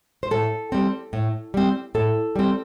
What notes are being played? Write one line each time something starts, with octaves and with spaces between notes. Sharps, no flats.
C5
A2 A4
G3 C4
A2
G3 C4
A2 A4
G3 C4